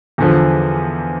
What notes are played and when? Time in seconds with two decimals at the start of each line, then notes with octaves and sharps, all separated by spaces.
0.18 E2 D3 F3